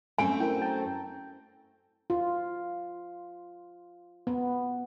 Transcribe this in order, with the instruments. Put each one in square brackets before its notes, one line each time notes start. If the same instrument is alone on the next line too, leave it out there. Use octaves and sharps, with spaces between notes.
[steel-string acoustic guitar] F#2 A3 C4 [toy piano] G#5
[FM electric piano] E4 A4 A#4 [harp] G5
[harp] G5 [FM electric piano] A5 A#5
[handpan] F4
B3